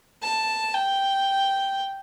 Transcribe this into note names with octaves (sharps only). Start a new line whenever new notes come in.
A5
G5